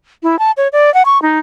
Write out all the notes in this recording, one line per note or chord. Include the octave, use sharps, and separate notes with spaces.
E4
A5
C#5
D5
F#5
C#6
D#4